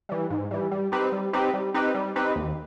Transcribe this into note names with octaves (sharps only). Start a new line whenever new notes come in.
E3 G3
G#2
E3 G3
G3
C4 D#4 G4 B4
G3
C4 D#4 G4 B4
G3
C4 D#4 G4 B4
G3
C4 D#4 G4 B4
D#2